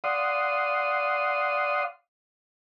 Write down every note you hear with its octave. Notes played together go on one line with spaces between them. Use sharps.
D5 F5 F#5 C6 D#6